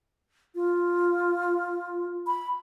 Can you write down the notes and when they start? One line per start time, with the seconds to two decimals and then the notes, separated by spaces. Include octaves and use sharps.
0.55 F4
2.27 B5